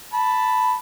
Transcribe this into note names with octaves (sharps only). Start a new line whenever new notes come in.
A5 B5